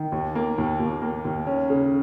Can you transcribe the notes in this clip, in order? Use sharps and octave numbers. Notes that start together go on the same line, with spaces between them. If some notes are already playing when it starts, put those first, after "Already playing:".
Already playing: D#3
D#2
A#3
D#2
D#2
A#3
D#2
C#4
C#3